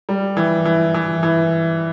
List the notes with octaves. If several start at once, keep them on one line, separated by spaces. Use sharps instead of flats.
G3
E3
E3
E3
E3